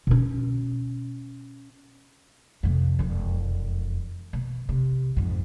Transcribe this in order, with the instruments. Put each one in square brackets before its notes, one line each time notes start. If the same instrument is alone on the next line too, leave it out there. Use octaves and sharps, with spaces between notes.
[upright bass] B2 C#4
F2 C3
E1 F2
B2
C3
F2 G#2